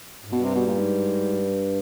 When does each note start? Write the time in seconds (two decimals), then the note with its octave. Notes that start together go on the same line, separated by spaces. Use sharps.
0.25 G#2
0.32 G2 B2
0.44 C3
0.55 B2
0.67 A#2
0.78 G#2